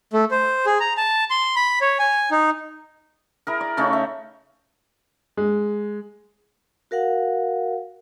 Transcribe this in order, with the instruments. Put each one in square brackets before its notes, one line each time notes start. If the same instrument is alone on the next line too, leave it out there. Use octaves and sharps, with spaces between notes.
[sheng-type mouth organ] A3
C5
G#4
A#5
A5
C6
B5
C#5
G#5
D#4
[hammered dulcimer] E4 G#4 A#4
D5
C#3 A3 C#4 D#4
E5
[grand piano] G#3
[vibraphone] F#4 A#4 F5 F#5